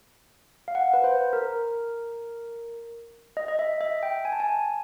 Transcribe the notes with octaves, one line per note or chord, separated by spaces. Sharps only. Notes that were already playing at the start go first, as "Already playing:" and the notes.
F5
F#5
B4
C5
A#4
D#5
D#5
E5
E5
G5
G#5
A5
G#5